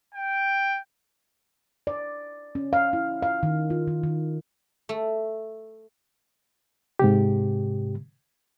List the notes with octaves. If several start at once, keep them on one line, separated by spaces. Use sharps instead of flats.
G5
D5
C#4
F5
E4
F5
D#3
F4
D#3
D#3
A3
G#2 C3 G4